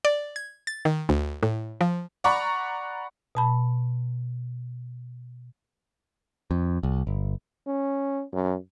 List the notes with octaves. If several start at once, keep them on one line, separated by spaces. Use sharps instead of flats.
D5
G#6
A6
D#3
D2
A2
F3
D5 F#5 A#5 B5 C#6
B2 A5 B5
F2
C2
G1
C#4
F#2